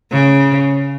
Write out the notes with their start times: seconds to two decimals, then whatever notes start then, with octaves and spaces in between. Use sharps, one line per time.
0.12 C#3